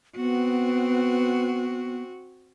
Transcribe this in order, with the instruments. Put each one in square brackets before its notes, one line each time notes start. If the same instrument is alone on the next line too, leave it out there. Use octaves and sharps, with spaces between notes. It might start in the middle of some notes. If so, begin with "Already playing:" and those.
[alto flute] B3 [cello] C4 F#4